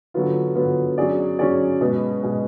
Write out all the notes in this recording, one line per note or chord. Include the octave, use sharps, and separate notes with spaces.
D3 F#3 B3 F4
D3 F#3 B3 F4
F#3 C#4 G#4 D5
F#3 C#4 G#4 D5
B2 G#3 B3
B2 G#3 B3